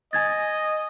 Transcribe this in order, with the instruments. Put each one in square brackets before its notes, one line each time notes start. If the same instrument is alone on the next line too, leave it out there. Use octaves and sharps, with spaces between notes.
[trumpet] D#5 [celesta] G#5 G#6 A6